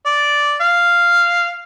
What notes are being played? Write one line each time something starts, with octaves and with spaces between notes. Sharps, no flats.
D5
F5